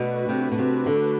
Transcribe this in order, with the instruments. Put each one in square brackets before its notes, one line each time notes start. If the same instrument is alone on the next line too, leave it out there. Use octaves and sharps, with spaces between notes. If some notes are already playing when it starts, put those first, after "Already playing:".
Already playing: [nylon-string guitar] B2 [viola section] A3 D4 F#4 B4
[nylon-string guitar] C3
B2
C3
D3